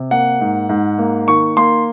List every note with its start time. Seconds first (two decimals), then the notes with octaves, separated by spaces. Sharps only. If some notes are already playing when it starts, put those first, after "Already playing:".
Already playing: C3
0.11 A#3 F#5
0.41 G#2
0.69 G#2
0.98 A#3
1.28 D#3 C#6
1.57 A#3 C6